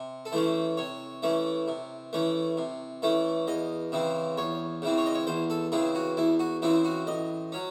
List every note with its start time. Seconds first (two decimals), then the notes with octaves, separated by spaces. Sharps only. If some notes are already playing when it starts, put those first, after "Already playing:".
Already playing: C3
0.25 A4
0.32 E3 A3 C#4 C5
0.77 C3 C#5
1.23 E3 A3 C#4
1.68 C3
2.13 E3 A3 C#4
2.57 C3
3.02 E3 A3 C#4
3.47 E2 D#5
3.92 C#3 E3 C4
4.37 E2 C#5
4.82 C#3 E3 C4
4.97 C#5
5.06 D#5
5.15 C#5
5.27 E2 C5
5.50 A4
5.72 C#3 E3 C4 G#4
5.95 F#4
6.17 E2 E4
6.40 F#4
6.62 C#3 E3 C4 E4
6.85 F#4
7.07 A1 D#5
7.52 F#3 C#4